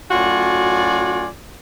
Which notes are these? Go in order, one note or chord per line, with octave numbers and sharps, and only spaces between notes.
F#2 A2 F4 F#4 D5 G#5